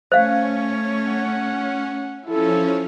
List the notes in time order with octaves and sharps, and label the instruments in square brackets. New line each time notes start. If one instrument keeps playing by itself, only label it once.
[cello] A3 C#5 [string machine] C#4 [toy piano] C5 F5
[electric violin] F#5
[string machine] F3 C#4 [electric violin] E4 A4